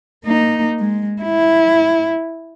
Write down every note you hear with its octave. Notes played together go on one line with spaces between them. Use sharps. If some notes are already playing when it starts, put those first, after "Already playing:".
A#3 D#4
G#3
E4